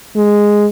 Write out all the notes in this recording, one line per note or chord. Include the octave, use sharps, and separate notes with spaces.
G#3